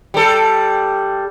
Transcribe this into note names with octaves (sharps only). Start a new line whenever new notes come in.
G3 A4